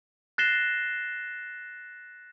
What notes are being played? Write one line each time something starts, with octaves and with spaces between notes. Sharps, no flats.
F#6 A6 A#6 C7 E7 G7